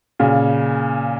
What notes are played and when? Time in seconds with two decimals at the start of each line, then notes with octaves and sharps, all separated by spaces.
0.19 A#2 C#3